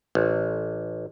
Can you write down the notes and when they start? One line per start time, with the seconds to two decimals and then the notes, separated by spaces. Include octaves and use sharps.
0.15 A1